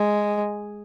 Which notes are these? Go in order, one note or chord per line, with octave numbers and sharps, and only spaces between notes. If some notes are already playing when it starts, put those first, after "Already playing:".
Already playing: G#3